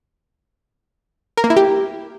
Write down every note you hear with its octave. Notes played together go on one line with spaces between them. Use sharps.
A#4
A#3
E4
G4